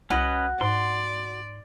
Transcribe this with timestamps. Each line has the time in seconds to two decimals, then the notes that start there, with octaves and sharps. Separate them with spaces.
0.10 C2 C#4 F#4 B4 D#5 F#5
0.61 G#2 D5 C6